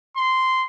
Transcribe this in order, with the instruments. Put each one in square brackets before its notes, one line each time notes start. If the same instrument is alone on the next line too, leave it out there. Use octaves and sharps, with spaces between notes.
[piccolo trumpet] C6